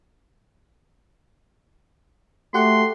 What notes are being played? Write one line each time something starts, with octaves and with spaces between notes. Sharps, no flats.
A3 F#4 G4 F#5 C6